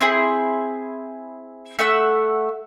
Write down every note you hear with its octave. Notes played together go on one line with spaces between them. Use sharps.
C4 E4 G#4
A3 E5 F#5 E6